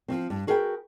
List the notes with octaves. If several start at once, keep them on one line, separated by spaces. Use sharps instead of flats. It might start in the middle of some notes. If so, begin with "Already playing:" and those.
F3 F#3 C4
G2
F#4 G#4 A#4 B4 F#5 G5